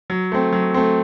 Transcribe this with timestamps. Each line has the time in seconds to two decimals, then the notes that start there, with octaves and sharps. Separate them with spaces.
0.10 F#3
0.32 A3 C4
0.52 F#3
0.74 A3 C4